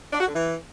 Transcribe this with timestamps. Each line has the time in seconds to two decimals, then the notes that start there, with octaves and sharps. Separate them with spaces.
0.12 D4
0.20 F#4
0.27 D3
0.35 E3